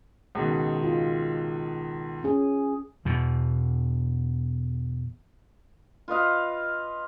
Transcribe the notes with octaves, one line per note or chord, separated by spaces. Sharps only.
C#2 B2 D#3
F4
C#4 G#4
E2 B2
F4 B4 D#5 F5